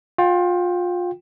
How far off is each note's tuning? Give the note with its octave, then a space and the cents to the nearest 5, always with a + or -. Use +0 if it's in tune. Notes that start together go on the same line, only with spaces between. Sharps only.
F4 +25 G5 +0